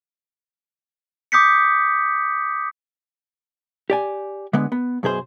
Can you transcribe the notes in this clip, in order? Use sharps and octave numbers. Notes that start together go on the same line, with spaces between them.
D6 D#6 G6 B6 C#7
G4 D5 G#5
D3 G#3 B3
B3
F#2 B2 G#4 C5